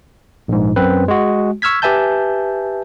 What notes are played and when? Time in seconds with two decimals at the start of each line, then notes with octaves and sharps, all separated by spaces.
0.48 A#1 G#2
0.76 F#2 C4 B4
1.08 G#3 F#4
1.62 C#6 E6 F6 G#6 B6
1.82 G4 B4 E5 G#5 A5 G6